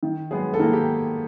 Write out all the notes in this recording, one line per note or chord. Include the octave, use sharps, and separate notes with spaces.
D#3
F#3 G#3 B3 G#4
A4
D#3 A#3 A#4
G4